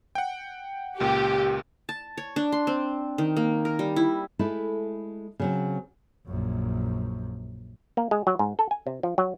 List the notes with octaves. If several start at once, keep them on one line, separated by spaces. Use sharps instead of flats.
F#5 G5
C#2 A#2 G4
A5
C#5
D4
C6
C4
D#3
A#3
A#4
G3
E4
G#3 A3 E4 A4
C#3 F#3 C4
A#1 F#2
A#3
G#3
F#3
G#2
A4
G#5
C3
F3
F#3